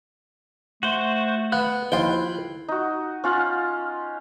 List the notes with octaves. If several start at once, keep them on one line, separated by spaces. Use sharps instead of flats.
A3 F#4 C5
B3 F5 F#6
D#2 F3 E4 F4 G5
D#4 F#4
C#4 F4 F#5